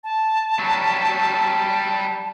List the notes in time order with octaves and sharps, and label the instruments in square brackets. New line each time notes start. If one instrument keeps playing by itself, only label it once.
[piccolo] A5
[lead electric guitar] F#3 G3